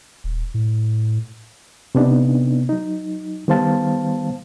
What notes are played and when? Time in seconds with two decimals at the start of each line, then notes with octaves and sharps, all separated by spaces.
0.24 D#1
0.54 A2
1.95 C3 B3 D4 D#4
2.69 F#3 D#4
3.48 D#3 G3 B3 C5 F5 A5